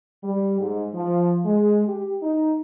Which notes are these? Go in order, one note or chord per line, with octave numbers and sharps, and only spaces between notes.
G3
G#2
F3
G#3
G4
D#4